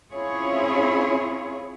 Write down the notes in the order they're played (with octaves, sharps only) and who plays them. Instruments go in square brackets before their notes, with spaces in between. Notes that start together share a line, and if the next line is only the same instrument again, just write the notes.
[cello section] C4 C#4 E4 F4 G#4 C#5